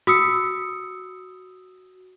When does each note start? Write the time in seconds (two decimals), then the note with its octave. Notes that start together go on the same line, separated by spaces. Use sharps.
0.07 F#4 D#6 E6 C#7